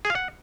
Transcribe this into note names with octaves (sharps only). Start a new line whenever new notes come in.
G#4
F5
F#5